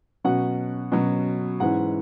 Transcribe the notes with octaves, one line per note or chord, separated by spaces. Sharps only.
B2 F#3 C#4 F#5
B2 F#3 C#4
G#2 E3 C#4 F#5